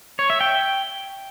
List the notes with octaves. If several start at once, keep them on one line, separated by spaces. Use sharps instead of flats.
C#5
E5
G5